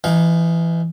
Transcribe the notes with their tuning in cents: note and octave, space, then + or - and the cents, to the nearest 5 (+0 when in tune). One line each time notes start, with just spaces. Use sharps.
E3 +20 D#4 -10 F5 +15